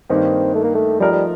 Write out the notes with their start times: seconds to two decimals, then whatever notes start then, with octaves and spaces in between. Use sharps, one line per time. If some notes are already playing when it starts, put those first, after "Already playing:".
0.09 G2 D#3 A#3 C4 D#4 G4
0.55 A3
0.64 A#3
0.75 A3
1.00 F3 G3 A3 D#4 A#4
1.13 G3